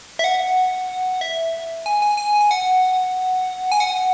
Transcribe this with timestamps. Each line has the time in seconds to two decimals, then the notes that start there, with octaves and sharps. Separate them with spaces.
0.19 E5
0.24 F#5
1.21 E5
1.86 G#5
2.02 G#5
2.17 G#5
2.41 G#5
2.51 F#5
3.72 G#5
3.80 F#5